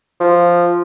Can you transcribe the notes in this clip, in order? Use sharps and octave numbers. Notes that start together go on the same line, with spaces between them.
F3